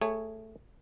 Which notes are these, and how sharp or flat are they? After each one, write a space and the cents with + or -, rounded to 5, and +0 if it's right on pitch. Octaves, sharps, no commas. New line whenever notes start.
A3 +5 G#4 -10 C#5 +0